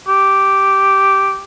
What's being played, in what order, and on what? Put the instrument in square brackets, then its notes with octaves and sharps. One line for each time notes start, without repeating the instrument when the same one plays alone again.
[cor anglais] G4